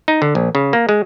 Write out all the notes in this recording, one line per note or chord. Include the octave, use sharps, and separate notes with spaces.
D#4
D3
A#1
C#3
A#3
G#3